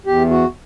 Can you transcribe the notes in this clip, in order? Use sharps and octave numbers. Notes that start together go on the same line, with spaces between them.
E2 G4
F#4